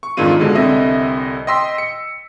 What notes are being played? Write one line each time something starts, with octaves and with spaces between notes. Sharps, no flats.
C#6
F2 G#2 D#3 D4 F4 D#7
B2 D3 G#3
C2 D3 C4 D#5 E5
D#5 G5 C6 E6 B6
C#7